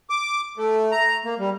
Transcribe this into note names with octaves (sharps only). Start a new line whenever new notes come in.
D6
A3
A#5
A#3
G3